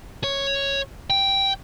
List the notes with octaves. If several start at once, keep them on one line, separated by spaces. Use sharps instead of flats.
C#5
G5